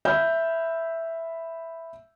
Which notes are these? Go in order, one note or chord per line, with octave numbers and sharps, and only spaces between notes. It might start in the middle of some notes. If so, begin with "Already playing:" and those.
E5 B5 E6 F6 G6